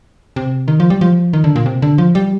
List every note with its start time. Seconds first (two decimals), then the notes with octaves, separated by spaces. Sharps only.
0.36 C3
0.68 D#3
0.80 F3
0.90 G3
1.01 F3
1.33 D#3
1.44 D3
1.56 A#2
1.66 C3
1.82 D3
1.98 F3
2.15 G3